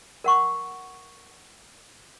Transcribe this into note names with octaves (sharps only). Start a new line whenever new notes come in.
A#4 F#5 C#6